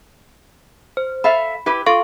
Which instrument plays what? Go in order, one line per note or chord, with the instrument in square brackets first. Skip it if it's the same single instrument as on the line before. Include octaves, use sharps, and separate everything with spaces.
[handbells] C5
[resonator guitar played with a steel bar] A4 E5 F5 [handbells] B5
[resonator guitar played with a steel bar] E4 G4 B4
[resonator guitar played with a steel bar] F4 [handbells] A4 F5 C#6